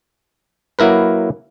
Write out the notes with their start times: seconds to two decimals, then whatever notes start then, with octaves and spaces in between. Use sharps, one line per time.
0.79 F#3 A#3 E4 A#4 B4